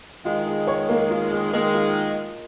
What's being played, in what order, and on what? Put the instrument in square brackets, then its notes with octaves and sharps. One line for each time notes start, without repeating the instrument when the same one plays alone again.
[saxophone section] D#3 G#3 [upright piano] F4
[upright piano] G#4
C#5
A#3
F4
G#4
[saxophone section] D#3 G#3 [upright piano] A#3
[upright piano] F4